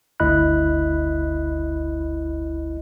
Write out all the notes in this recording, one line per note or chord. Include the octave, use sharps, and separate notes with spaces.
G1 D2 E4 D#5 B5 F#6